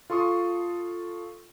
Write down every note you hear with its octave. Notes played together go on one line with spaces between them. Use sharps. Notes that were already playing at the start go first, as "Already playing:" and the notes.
F4 A4 C6 C#6 D#6